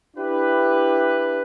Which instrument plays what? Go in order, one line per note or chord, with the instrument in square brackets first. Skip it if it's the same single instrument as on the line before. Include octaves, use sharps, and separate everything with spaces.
[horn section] D4 E4 G4 B4